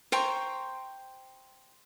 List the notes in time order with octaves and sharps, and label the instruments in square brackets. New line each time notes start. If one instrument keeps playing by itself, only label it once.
[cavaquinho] C5 G5 A#5 C#6